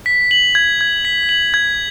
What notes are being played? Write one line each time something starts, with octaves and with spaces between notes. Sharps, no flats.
B6
F#7
G#6
G#6
B6
F#7
G#6